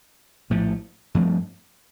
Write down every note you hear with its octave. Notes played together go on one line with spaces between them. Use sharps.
A#1 A2 F3 A3
G2 F3 A3 C4